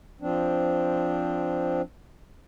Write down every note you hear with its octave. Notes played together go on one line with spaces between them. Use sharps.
F3 C4 D4